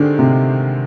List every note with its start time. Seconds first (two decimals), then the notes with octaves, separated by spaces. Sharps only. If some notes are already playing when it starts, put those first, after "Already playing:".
Already playing: D3 D#3 G#3 C4 G4
0.19 C3